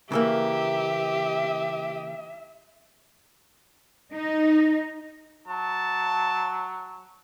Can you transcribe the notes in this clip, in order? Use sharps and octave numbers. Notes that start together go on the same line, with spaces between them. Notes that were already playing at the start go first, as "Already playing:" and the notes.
C#3 E3 A#3 G4 E5
D#4
F#3 A5